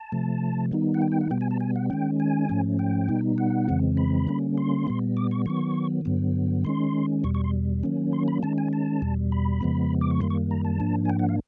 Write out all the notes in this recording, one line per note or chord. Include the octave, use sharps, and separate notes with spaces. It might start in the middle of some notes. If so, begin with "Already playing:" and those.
Already playing: A5
C3 F3 A3
D#3 G3 B3 D#4
F#5
G5
G5
F#5
B2 G3 B3 G5
G#5
A5
G#5
F#5
D#3 G#3 C#4 G5
G#5
G#2 F3 A3 C#4
G5
B2 G3 B3 D#4
F#5
F2 C#3 E3 G#3 C4
B5
D3 G3 A#3 C#4
C6
A#2 G3 B3
D6
C#6
D#3 F#3 B3 C#6
G2 D3 F#3 B3
D#3 G#3 C#4 C6
E2 B2 G3 C#6
C#6
C6
D#3 F#3 A#3 C#4
C6
B5
D#3 G#3 C#4 A5
G#5
A5
E2 B2 G3
B5
F2 C#3 F3 G#3 B3
D6
C#6
F#2 D#3 G3 A#3 C6
C#6
A#5
A5
G#2 F3 A#3 D4
G#5
G5
F#5
F5